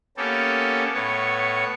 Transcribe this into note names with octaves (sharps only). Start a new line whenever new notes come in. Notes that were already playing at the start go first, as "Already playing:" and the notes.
A#3 B3 C#4 G4 A4
A2 B3 C#5